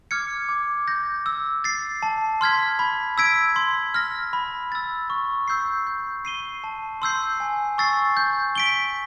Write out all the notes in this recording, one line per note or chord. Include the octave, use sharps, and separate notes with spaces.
D6 F6 G#6 C#7
D6
G6 A#6
E6
A6 C7
A5
C6 F6 G#6 B6
B5
E6 G#6 B6 D7
C6
F6 A#6
B5
E6 A6
C#6
E6 G6 C7
G6
C7 D#7 G7
A5
C6 E6 G6 C7
G#5
C#6 E6 A6 C7
G6
B6 D7 G7